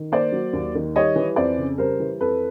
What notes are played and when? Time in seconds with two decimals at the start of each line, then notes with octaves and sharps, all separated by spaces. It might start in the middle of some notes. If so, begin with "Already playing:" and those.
Already playing: D#3
0.12 A#3 C5 D5
0.32 F#3
0.53 D#2
0.75 D#3
0.96 G3 C#5 D#5
1.16 E3
1.36 F2 C5 D5
1.58 C#3
1.78 G3 A#4 C5
2.00 E3
2.20 F2 A4 B4